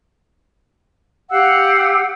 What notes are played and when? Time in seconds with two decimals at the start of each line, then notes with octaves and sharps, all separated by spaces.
1.30 G4 F5 F#5 E6